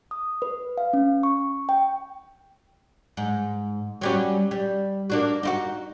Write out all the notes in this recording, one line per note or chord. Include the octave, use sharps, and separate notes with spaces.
D#6
B4
F5
C#4
C#6
G5
G#2
F#3 G3 C#4
G3
A#3 D4 F#4
D#4 E4 F#4